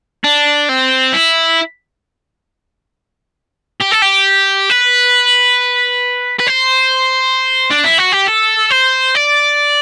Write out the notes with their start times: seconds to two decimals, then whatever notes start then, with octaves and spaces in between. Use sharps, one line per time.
0.24 D4
0.69 C4
1.13 E4
3.80 G4
3.91 A4
4.02 G4
4.70 B4
6.40 B4
6.48 C5
7.71 D4
7.84 E4
7.98 F#4
8.12 G4
8.26 A4
8.71 C5
9.15 D5